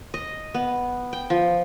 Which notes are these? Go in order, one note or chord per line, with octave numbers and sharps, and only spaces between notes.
D#5
B3
G5
F3